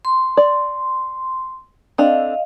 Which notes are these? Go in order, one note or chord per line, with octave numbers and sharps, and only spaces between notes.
C6
D5
C4 D4 A4 D#5 F5